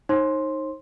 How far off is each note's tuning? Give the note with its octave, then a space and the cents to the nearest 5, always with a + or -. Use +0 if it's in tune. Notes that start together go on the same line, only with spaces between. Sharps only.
D#4 +0 C5 +45 C6 +0